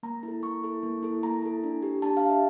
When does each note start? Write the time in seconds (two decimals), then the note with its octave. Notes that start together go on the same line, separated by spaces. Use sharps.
0.03 A#3 A#5
0.23 E4 A4
0.42 A#3 C#6
0.63 E4 A4
0.83 A#3
1.03 E4 A4
1.23 A#3 A#5
1.42 E4 A4
1.64 D4
1.83 G4
2.02 D4 A5
2.17 F5
2.24 G4
2.30 E5